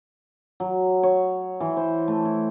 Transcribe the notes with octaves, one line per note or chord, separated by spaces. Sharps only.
F#3
C#5
E3
C5
A3
E4